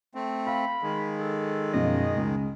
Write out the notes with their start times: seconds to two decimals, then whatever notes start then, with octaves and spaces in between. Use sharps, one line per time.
0.15 A3 C4
0.47 F5 B5
0.82 D#3 G#3
1.19 A4
1.74 F#2 B2 F3 D#5
2.16 C#2